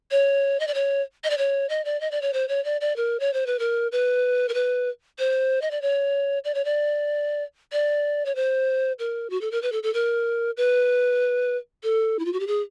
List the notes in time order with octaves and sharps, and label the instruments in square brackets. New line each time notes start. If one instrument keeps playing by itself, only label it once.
[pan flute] C#5
D#5
D5
C#5
D#5
D5
C#5
D#5
D5
D#5
D5
C#5
C5
C#5
D5
D5
A#4
C#5
C5
B4
A#4
B4
A#4
B4
C5
D#5
D5
C#5
D5
C#5
D5
D5
C#5
C5
A#4
F#4
A4
A#4
B4
A4
A4
A#4
B4
A4
E4
F4
F#4
G4
G#4